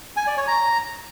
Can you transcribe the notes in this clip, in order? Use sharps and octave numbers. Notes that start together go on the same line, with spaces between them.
G#5
D5
C#5
A#5